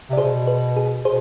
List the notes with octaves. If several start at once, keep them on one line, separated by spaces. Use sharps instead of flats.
C3
D5
B2 G#4 C5
B4
G#4
B2 G#4 C5